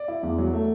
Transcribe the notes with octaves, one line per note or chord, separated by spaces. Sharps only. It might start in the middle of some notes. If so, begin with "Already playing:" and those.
Already playing: D5
E4
E2
F#3
A3